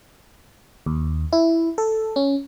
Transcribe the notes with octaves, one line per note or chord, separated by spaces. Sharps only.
D#2
E4
A4
C#4